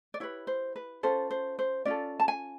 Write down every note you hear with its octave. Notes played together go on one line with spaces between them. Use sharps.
D5
E4 G4 B4 C#5
C5
B4
C#4 F4 A4 C5
C5
C5
C#4 F4 A4 D5
A5
G#5